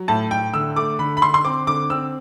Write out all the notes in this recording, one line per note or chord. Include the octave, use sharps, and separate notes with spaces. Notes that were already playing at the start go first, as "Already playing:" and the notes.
Already playing: F#3
A2 A5
A2 G5
D3 E6
A3 D6
D3 B5
B5
D3 C6
C6
C4 D6
D3 D6
C4 E6